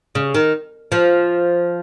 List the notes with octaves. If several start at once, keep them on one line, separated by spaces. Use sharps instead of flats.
C#3
D#3
F3